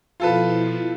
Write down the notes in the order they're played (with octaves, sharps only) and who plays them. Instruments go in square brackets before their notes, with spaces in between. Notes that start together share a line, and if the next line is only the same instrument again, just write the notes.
[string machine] B2 F3 E4 [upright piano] F4 A4 B4